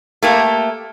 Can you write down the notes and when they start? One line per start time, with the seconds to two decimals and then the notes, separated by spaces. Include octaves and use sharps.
0.22 A3 A#3 G4